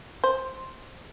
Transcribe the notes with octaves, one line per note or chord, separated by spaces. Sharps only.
C5